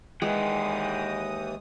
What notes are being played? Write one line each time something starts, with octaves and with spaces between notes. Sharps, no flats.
D#2 E3 G#3 D#5 F#5 G5 D#6